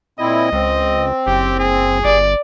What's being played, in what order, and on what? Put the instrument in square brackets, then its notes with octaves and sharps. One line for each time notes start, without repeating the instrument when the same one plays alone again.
[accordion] A#2 C4 E4 [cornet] D#5
[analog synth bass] C#2 [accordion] C4
[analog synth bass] F#1 [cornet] G4
[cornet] G#4
[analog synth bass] G1 [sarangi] D5